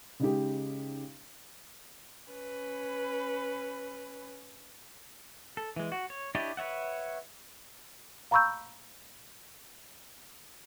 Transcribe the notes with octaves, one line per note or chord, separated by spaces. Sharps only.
C#3 G#3 D#4 G4
C#4 B4
A4
E3 G#3
F#4
C#5
D4 E4 G4 C#5 D#5
B4 C#5 E5 F#5
F5 A#5 B5 C#6 E6 G6